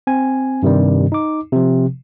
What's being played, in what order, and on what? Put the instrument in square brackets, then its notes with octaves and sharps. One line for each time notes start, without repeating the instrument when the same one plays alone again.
[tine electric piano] C4 G#5
G2 C3 D#3 G3
D#4 D6
C3 F3